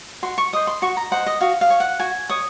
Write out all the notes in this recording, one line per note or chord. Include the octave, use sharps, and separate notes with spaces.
F#4 C6
C#6
C5 D#5 D#6
C6
F#4 C#6
A#5
C5 D#5 F#5
D#5
F#4 F5
F5
C#5
F#5
F#4 G#5
C#5 D#6